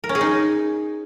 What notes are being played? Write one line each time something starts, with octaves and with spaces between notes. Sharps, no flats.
A#4
C#4
G#4
D#4